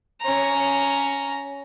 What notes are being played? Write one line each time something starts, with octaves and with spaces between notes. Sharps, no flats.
C#4 A#5